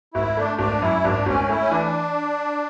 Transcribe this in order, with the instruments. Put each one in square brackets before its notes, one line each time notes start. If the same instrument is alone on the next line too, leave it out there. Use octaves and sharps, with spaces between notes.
[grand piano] G#1 [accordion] E4
[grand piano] A3 [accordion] D4
[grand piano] G#1 [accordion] D4
[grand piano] F#2 [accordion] E4
[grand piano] G#1 [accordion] D4
[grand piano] G#1 [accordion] C#4
[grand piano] A3 [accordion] E4
[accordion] C#4
[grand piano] E3 [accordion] D4